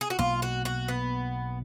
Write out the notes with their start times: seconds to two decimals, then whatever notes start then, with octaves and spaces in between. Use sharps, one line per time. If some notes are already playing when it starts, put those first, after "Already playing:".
0.01 G#4
0.10 F#4
0.19 B1 B2 A#3 F4
0.42 F#4
0.65 F#4
0.88 B3